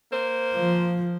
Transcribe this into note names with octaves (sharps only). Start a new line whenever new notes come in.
A#3 A#4 C5
F3